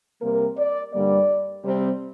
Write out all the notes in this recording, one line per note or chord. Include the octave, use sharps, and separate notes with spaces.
C3 G3 A#3 A#4
D5
G2 D3 G3 A#3 D5
C3 G3 C4 C5